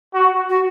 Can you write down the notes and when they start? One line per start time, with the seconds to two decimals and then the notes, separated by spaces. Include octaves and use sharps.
0.14 F#4
0.49 F#4